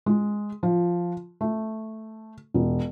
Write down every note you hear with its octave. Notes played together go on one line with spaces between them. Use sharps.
G#3
F3
A3
E1